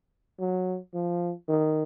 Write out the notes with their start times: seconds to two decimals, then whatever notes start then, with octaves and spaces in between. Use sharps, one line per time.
0.40 F#3
0.94 F3
1.49 D#3